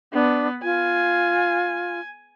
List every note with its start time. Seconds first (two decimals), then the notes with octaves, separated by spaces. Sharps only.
0.13 B3 D4
0.64 F4 G#5